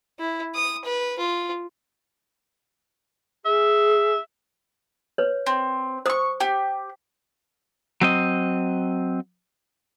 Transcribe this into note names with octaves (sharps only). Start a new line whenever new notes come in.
E4
D#6
B4
F4
G#4 E5
B4 C#5
C4
C5 C#6 D#6 E6
G4 G5
F#3 C4 D#5